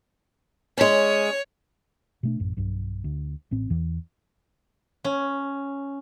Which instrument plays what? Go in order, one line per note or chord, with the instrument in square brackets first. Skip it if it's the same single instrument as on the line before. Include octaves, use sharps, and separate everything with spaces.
[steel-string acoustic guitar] G#3 C#4 [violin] C#5
[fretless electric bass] B2 A3 D4
A1 F#2
B1 G2
D2
A1 A2 C4
E2 E3
[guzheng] C#4